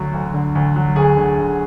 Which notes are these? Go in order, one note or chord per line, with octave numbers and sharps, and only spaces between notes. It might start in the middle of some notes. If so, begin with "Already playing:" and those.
Already playing: D2 F#3 F#4
D2
D3
D2
F#3
D2 G#4
D3
D2